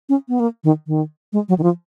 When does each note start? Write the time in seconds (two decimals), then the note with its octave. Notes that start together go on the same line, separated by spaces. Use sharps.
0.09 C#4
0.29 B3
0.40 A#3
0.64 D#3
0.87 D#3
1.33 G#3
1.49 F#3
1.58 D#3
1.63 F3